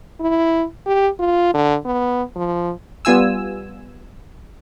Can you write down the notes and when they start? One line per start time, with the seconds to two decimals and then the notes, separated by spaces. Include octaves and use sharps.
0.20 E4
0.86 G4
1.19 F4
1.54 D3
1.85 B3
2.36 F3
3.05 G3 B3 F4 G#5 E6